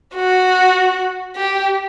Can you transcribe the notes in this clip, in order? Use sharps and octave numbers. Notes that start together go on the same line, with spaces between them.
F#4
G4